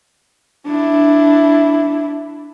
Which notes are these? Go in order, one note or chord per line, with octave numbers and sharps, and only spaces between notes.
D4 E4